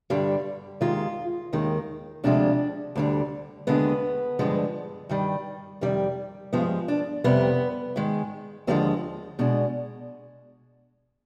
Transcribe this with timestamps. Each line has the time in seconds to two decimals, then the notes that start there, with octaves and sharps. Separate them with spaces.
0.10 G2 D3 G3
0.81 D#2 D#3 G#3 F4
1.53 D#2 D#3 G#3
2.24 D2 C3 F3 G#3 D4
2.96 D2 D3 G3
3.67 D#2 D3 G#3 B3
4.39 G2 D3 F3 G#3
5.09 G2 D#3 G3
5.81 F2 C3 D#3 G3
6.53 G2 F3 G#3 B3
6.88 D4
7.24 F2 C3 G3 B3
7.96 G#2 D#3 G#3
8.67 D#2 D3 F3 G#3 C4
9.39 B2 G#3 D4